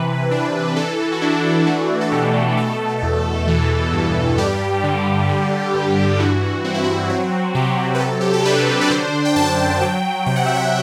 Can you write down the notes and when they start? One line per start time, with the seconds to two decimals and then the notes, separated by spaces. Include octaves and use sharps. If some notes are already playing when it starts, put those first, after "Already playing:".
Already playing: C3 E3 B4
0.31 D4
0.76 E3 A4
1.12 F#4
1.21 D4 E4
1.67 A3 F#4
2.01 A4
2.12 B2 G4
2.57 B2 A4
3.02 E2
3.48 E3
3.93 G2
4.38 G3 G4
4.84 D3
5.29 D3
5.74 G2
6.19 E3 F#4
6.64 C4 F#4
6.74 E4
6.84 F#4
7.09 F#3 F#4
7.55 C3 G4
7.95 B4
8.00 F#3 A4
8.21 G4
8.33 A4
8.45 D4 B4
8.81 D5
8.90 D3 C5
9.25 G5
9.36 F#2 A5
9.81 F#3 G5
10.26 C3 G5
10.36 F#5
10.46 E5
10.55 F#5